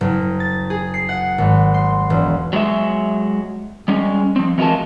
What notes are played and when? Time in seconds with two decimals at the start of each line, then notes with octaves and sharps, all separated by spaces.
0.01 F#1
0.40 A6
0.70 G#4
0.94 C7
1.09 F#5
1.38 G#1
1.74 C6
2.10 E1
2.53 F#3 G#3 E5
3.88 G3 G#3 C#4
4.36 F3 C4
4.58 E3 G#3 F4 F#4 A#4 A5